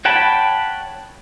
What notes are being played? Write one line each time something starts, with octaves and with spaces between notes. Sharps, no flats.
C#5 F#5 G5 A5 B5